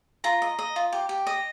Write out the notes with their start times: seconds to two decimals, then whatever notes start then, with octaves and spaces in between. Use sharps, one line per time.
0.24 F4 A#5
0.42 D#5
0.59 D#5
0.76 F4
0.93 G4
1.09 G4
1.27 D#5